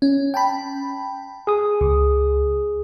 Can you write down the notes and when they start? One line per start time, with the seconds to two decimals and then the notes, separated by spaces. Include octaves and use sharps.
0.02 C#4
0.34 G5 A5 B5
1.47 G#4 D#6
1.81 C#2